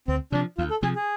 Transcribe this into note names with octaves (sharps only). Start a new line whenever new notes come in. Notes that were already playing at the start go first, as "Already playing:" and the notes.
D2 C4
C3 F3 D4
D2 F4
A4
C3 F3 G#4
G#4